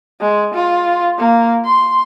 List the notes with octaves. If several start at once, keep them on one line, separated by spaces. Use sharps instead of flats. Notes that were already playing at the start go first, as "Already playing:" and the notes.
G#3
F4
A#3
C6